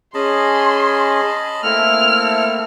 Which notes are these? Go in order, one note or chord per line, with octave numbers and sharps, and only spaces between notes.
C#4 G#4 D#5 A5 B5 C6
A3 A#3 C4 E4 A4 F6